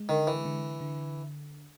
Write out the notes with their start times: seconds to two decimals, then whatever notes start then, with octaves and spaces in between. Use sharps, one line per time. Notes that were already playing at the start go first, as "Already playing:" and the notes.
Already playing: G#3
0.09 D3 D#3
0.27 E3
0.45 D3
0.81 D3